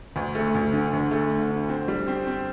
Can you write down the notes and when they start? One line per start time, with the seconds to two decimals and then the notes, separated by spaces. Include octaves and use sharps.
0.16 D2
0.35 A3
0.55 D2
0.73 D3
0.93 D2
1.11 A3
1.31 D3
1.51 D3
1.69 C4
1.88 G3
2.08 C4
2.27 C4